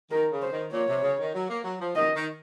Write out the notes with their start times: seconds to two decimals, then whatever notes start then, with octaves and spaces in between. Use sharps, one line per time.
0.11 D#3 A#4
0.32 C#3
0.42 C5
0.52 D#3
0.72 A#2 C#5
0.88 C3
1.03 C#3
1.19 D#3
1.34 F#3
1.50 A#3
1.64 F#3
1.80 F3
1.96 D#3 D#5
2.16 D#3